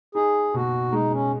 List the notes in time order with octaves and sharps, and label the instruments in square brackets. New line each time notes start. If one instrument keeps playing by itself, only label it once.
[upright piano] D#4 [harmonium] G#4
[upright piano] B2 [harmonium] F#4
[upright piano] G#3 [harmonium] D#4
[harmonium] C#4